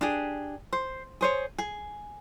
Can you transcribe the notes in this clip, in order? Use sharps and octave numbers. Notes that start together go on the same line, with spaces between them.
D4 G4 G#4
C5
G#4 C5 C#5
G#4